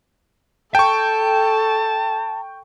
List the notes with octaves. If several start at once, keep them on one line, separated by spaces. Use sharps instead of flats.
A4 G5 A5 C#6